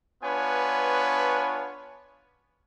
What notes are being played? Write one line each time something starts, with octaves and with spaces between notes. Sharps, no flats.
B3 D4 F4 B4 C#5 G#5